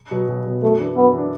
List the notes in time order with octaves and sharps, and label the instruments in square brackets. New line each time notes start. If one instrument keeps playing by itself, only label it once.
[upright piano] B2 F#3 B3
B1
B2 F#3 B3
[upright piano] F#2 [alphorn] A3
[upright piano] E3 D4
[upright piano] F#2 [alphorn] B3
[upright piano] E3
D4